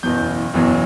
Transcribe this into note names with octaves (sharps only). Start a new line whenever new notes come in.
F#1 E2 B2 F#3 G6
F#1 E2 B2 F#3